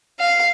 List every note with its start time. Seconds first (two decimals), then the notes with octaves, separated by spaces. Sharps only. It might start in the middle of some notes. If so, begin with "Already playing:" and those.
0.20 F5